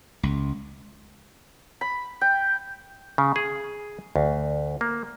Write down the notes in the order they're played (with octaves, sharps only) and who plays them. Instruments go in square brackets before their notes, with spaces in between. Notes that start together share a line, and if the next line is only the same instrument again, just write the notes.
[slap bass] C#2
[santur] B5
G5
[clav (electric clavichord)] C#3
G#4
D2
A#3